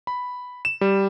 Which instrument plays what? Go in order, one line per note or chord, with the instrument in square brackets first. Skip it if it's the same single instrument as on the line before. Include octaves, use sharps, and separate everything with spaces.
[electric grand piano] B5
E7
G3